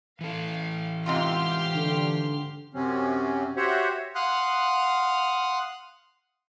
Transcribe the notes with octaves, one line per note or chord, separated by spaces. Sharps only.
E3 A4 F5
G#2 C3 F4 G4 C6 F6
D3
F#2 C3 F#3 C4 C#4
F#4 G4 C5 C#5 E5 F#5
F5 F#5 C6 D#6 F6 F#6